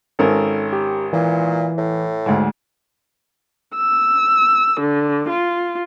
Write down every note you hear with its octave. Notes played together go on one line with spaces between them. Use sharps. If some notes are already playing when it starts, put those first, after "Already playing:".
G#1 C#4 A4 A#4 A#5
G4
A#2 E3
A2
D2 G#2
E6
D3
F4